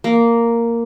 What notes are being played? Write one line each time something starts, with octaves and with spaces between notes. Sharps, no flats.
A#3